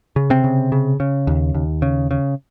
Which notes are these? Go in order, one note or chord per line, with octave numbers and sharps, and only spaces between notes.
C#3
C3 C4
C#3
C#3
C#3
D#2
D#2
C#3
C#3